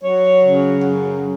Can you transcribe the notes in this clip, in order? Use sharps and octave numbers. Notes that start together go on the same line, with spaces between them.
F#3 C#5
C#3
F#2